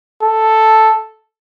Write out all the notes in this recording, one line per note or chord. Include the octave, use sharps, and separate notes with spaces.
A4